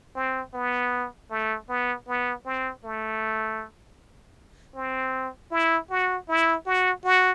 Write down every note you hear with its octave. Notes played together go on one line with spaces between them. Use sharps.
C4
B3
A3
B3
B3
C4
A3
C4
E4
F#4
E4
F#4
F#4